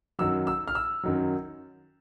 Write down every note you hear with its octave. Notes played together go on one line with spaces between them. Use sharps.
F#2 D#3 F#3 E6
E6
F6
E6
F#2 D#3 F#3